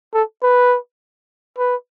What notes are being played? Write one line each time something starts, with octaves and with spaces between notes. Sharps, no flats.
A4
B4
B4